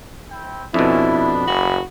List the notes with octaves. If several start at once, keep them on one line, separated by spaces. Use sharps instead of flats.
C4 E4 G5
F2 B2 C#4 D4 E4 A4
B3 B5
F#1 F#4